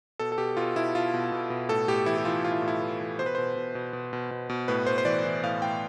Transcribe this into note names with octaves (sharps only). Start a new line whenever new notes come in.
B2 A4
A4
B2 G4
B2 F4
B2 E4
B2 F4
B2
B2
B2
A2 A4
A2 G4
E3 E4
G4
E3 F4
A2 F4
E4
A2
E4
E3
E3
B2 C5
B4
B2 C5
B2
B2
B2
B2
B2
B2
A2 B4
A2 C5
C5
E3 D5
E3
A2 F5
A2 G5